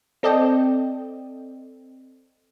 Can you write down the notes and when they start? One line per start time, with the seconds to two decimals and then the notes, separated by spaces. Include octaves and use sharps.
0.23 C4 A4 D5 D#5 G5